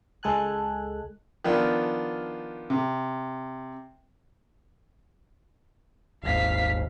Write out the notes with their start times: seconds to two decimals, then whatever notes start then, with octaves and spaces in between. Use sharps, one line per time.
0.23 C#2 G#3 A4 G#5 F#6
1.44 D#3 F3 B3 D4 F4
2.70 C3
6.23 D#1 G#1 G#2 F5 B6